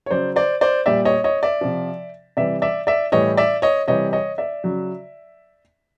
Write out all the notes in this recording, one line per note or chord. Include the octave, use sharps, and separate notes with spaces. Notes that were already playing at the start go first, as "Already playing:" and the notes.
C#5
C#3 F#3 C5 D5
C5 D5
C5 D5
A#2 G3 D5 E5
C#5 D#5
C#5 D#5
D5 E5
C3 F3
C3 E3 G3 D5 E5
D5 E5
D5 E5
A2 E3 G3 C#5 D#5
D5 E5
C#5 D#5
C3 E3 G3 C#5 D#5
C#5 D#5
D5 E5
C#3 F#3